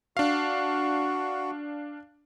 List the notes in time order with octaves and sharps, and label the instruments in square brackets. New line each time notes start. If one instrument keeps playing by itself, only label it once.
[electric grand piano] D4 F5 [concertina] F#4